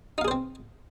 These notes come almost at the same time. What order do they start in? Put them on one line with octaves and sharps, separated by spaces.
D#4 F5 G#4 C5 C4